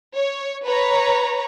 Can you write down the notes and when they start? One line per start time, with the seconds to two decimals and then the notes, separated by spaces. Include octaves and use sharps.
0.14 C#5
0.65 B4 C#5 A#5